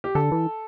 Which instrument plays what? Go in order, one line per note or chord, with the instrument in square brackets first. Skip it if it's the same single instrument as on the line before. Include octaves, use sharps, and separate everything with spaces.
[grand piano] G4
[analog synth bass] D3 [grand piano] A4
[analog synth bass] E3